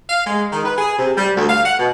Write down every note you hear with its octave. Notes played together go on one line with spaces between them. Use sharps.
F5
G#3
D#3
B4
G#4
C3
G3
D2
F5
F#5
B2